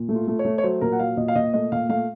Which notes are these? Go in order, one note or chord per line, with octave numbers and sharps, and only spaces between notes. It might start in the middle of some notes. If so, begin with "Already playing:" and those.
Already playing: A#2
A3
F4
A3
C#5
A3
C#5
F#3 C5
A#2 A#4
F#5
F#3 F5
A#2 D#5
F5
A#2 D#5
A3 D#5
A#2 F5
A3 F5